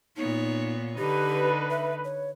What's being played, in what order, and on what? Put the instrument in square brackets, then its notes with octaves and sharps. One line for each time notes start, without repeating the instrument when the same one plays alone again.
[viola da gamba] A#2 B3 C#5 [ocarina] D#4
[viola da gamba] D3 D#4 [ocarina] G4 [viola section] B4
[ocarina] E5
C#5